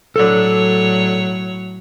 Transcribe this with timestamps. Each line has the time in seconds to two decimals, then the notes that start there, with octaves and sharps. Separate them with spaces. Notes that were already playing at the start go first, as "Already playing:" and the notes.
0.16 A2 F#3 A4 C#5 D5